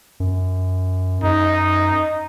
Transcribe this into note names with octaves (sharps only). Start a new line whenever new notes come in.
F#2
F#2 D#4